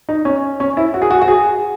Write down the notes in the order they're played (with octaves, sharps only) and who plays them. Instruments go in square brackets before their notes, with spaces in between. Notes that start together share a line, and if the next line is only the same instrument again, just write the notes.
[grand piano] D#4
C#4
C#4
E4
F#4
G#4
F#4
F#4
G#4